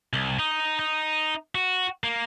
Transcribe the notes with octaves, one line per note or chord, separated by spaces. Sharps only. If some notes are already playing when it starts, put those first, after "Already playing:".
C2
D#4
D#4
F#4
A#3